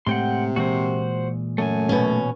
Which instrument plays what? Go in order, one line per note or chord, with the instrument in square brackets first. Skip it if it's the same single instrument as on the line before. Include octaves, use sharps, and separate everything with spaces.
[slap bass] A2 G#3 [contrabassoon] C3 [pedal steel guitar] F#5 G5 C6
[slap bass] A#2 E3 G#3 [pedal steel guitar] F#4 C5
[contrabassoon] F#2 [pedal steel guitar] A3 G#5
[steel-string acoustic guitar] B2 C#4